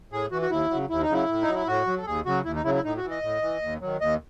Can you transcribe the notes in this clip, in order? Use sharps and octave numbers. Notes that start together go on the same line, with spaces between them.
A2 G#4
E3 F#4
F#4
D#2 E4
C#3 F#3
D#2 E4
D#4
C#3 F#3 E4
A2
D#4
F#3
E4
A2 F#4
F#3
A4
D#2 G#4
C#3 F#3 F#4
D#2 E4
D#4
C#3 F#3 E4
E4
A2 D#4
F#4
E3
D#5
A2
E3
D#2
D#3 F#3
D#2 D#5